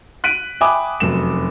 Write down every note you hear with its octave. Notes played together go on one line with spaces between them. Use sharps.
F#6 B6 D7 D#7
E5 G5 G#5 B5 D6 D#6
F1 F#2 E7